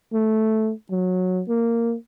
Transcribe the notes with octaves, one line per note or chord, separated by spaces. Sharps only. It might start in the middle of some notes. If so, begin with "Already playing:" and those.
A3
F#3
A#3